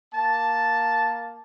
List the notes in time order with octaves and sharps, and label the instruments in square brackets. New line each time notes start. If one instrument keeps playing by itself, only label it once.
[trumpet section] A#3 A5